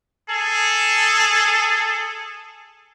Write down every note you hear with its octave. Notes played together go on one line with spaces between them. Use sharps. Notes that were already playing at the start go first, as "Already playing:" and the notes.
G#4 A4